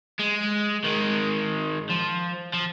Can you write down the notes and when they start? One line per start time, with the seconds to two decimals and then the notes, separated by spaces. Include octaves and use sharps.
0.20 G#3
0.84 D#3 G#3
1.90 F3
2.54 F3